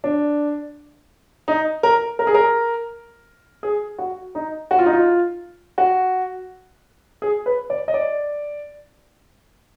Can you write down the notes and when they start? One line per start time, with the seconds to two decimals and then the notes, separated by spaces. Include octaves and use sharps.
0.04 D4
1.48 D#4
1.83 A#4
2.19 A#4
2.27 G#4
2.34 A#4
3.63 G#4
3.99 F#4
4.35 D#4
4.71 F#4
4.79 F4
4.86 D#4
4.93 F4
5.78 F#4
7.22 G#4
7.46 B4
7.70 D5
7.88 D#5
7.94 D5